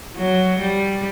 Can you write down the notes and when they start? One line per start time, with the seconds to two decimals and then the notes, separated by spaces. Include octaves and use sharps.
0.16 F#3
0.59 G3